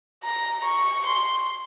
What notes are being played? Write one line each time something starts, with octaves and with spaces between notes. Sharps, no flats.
A#5
C#6
C6